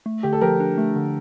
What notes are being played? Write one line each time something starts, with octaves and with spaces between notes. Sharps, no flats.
A3
D3 G4
A4
F3 G4 A#4
D4
A3
D3